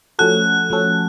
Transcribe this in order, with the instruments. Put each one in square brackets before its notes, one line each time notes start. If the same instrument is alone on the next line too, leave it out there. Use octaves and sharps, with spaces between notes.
[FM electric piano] F3 A3 C#4 F#4 A4 [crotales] F#6
[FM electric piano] F3 A3 C#4 F#4 A4